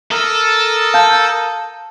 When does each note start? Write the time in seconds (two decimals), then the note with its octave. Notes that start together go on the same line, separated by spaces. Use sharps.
0.11 A4 A#4 D#6
0.94 F5 A5 G6